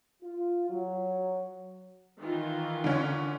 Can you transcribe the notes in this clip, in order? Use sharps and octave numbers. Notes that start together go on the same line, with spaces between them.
F4
F#3
D#3 E3 F4
D3 C#4